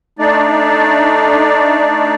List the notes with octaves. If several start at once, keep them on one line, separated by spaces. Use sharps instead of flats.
A3 D4 D#4 D5